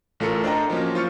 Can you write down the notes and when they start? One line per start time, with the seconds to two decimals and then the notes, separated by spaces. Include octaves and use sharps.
0.20 A1 A3 F4 A4 A#4 C#7
0.44 D4 C5 D5 D#5 G5 A#5
0.70 F3 F#3 A#3 C#4
0.95 F4 C5 C#6 F6 C#7